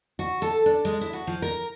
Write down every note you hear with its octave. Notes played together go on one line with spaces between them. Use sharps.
F#4
A4
D4
G#3
E4
F#4
F3
A#4